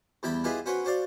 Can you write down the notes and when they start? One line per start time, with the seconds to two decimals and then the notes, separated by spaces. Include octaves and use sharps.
0.23 E2 G3 E4 G5 B5
0.44 E4 F4 G4 G#4 B4 D#5
0.66 C#4 F#4 B4 C5 F#5
0.85 F#4 C5 D5 F5